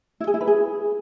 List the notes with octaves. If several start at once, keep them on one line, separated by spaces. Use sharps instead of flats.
E4
G#4
E4
B4
G#4